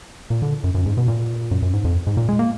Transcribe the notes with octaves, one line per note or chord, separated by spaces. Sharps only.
A#2
D3
F#2
F#2
G#2
B2
A#2
F#2
F#2
G#2
F2
G#2
A#2
G#3
A#3